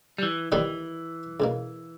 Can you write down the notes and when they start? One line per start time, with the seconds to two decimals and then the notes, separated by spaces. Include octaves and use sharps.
0.18 G3
0.23 E3
0.52 D#2 D#3 E3 G3 B3 D#4
1.40 C#2 B2 A#3